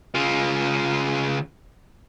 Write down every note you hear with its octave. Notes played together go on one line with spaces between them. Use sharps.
C#3 F4